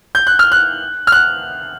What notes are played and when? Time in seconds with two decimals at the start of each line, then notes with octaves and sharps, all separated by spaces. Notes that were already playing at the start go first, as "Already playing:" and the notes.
0.15 G6
0.27 F#6
0.39 F6
0.52 F#6
1.07 F6
1.12 F#6